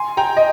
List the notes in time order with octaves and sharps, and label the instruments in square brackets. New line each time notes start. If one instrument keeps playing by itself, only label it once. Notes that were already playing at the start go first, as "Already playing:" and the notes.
Already playing: [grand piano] G#5 C6
G5 A#5
D#5